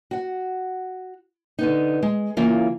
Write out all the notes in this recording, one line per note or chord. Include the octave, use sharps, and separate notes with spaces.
F#4 F#5
D3 B3 D#4
G#3
C#3 E3 A#3 F4